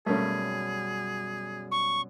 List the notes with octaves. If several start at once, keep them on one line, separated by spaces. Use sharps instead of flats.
F#2 B2 G3 A3 A#3 C#4 G#4
C#6